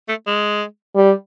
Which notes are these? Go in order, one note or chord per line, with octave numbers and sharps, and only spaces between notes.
A3
G#3
G3